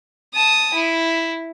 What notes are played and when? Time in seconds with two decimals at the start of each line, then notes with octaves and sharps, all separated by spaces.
0.34 A5 D#6
0.74 E4